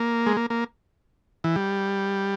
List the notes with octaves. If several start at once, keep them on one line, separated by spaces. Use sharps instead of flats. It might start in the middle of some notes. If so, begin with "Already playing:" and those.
Already playing: A#3
G#3
A#3
A#3
E3
G3